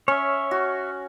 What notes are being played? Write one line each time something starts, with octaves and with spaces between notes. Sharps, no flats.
C#4 C#5 E5
F#4